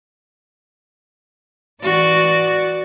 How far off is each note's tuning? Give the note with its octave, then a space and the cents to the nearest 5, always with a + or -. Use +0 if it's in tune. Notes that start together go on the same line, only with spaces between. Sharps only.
E3 -10 F#4 +0 D5 +0